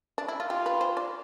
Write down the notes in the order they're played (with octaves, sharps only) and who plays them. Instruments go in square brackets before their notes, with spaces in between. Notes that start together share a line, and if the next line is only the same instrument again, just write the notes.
[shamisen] D4
E4
F4
[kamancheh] F4 [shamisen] G4
[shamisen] B4
C5
D5